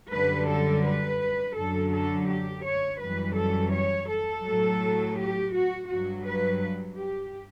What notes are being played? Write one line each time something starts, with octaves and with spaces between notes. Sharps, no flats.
F#2 D3 G3 B4
A4
B4
F#2 D3 F#3 A4
A4
G4
C#5
F#2 E3 G3 B4
A4
C#5
A4
A2 F#3
G4
F#4
G2 F#3 F#4
B4
G4